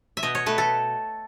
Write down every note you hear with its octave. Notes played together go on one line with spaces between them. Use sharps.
E5
B2 D#5
C#5
A3 B4
A4